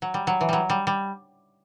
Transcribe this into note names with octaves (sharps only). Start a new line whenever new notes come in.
F#3
G3
F#3
E3
F#3 G3
G3
G3